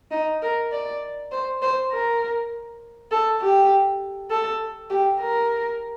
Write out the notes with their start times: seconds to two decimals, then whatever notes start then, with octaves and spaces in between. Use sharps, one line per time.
0.11 D#4
0.42 A#4
0.72 D5
1.31 C5
1.62 C5
1.91 A#4
3.11 A4
3.41 G4
4.30 A4
4.90 G4
5.20 A#4